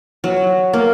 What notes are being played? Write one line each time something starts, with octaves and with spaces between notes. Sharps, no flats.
F#3
A#3